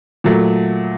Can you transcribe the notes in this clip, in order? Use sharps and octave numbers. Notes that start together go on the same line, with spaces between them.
A#2 F#3 A3